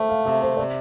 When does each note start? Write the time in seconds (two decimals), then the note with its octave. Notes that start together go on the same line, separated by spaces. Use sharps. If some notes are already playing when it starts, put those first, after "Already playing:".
Already playing: A3 C5 E5
0.09 F5
0.25 C3 E5
0.42 C5
0.57 C3 D5